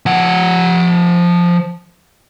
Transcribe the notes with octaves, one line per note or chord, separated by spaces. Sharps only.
F3 F#5